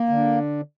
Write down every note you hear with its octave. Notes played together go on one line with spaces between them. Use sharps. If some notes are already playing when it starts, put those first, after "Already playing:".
Already playing: A#3
D3